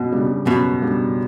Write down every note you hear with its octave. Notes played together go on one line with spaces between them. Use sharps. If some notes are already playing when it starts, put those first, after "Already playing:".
Already playing: F#2 B2
C#3 G3 D4
F#2 B2
C#3 G3 D4